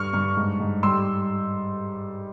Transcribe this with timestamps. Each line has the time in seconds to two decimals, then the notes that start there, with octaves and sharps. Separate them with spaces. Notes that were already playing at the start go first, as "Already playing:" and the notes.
Already playing: G2 C#6 F6
0.13 G2
0.37 G#2
0.60 G#2
0.83 G3 C6 E6